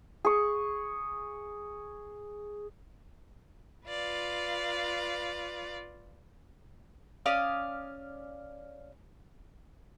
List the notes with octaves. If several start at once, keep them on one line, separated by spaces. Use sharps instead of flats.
G#4 C#6
F4 B4 D5 F5
C#4 D5 F5 D#6